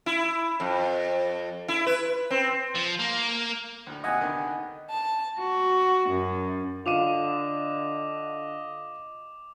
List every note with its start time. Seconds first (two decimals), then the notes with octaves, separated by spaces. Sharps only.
0.06 E4
0.60 F2
1.68 E4
1.87 B4
2.31 C4
2.75 F3
2.99 A#3
3.86 D2 A2
4.04 D#2 C3 D#5 F#5 G#5
4.20 D3 D#3 B3
4.90 A5
5.39 F#4
6.09 F#2
6.86 D3 F4 D#5 F5 D6 D#7 F7